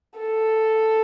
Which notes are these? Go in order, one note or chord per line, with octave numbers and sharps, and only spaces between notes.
A4